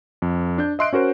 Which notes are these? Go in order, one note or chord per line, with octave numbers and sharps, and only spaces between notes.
F2
D4 G6
D#5 E5 C6 E6 F#6 D7
C#4 F#4 A#4 C5